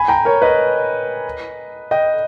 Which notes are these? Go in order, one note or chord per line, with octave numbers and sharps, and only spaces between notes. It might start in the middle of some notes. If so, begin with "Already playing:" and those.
Already playing: G#5 B5
G5 A#5
A#4 C#5
B4 D#5
D#5 G5